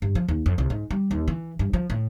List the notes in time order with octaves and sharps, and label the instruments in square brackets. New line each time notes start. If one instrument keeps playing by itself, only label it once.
[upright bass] G2
F3
D#2
F2
C2
G#2
G3
D#2
E3
G2
F3
A2